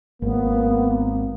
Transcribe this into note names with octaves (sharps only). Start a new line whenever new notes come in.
G#1 A#3 B3